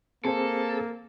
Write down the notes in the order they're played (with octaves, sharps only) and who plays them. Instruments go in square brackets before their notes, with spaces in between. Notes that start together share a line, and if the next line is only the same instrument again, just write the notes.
[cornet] A#3 [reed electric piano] C4 G#4 C5 [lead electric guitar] A4